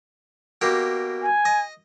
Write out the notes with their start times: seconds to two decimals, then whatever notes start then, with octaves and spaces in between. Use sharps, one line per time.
0.61 B2 A#3 G4
1.22 G#5
1.45 D#5